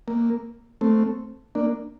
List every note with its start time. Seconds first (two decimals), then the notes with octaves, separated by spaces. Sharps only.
0.08 A#3
0.81 A3 C4
1.55 A#3 D4